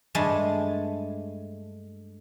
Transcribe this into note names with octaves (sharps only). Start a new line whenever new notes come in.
G2 G#3 A3 G#5 A5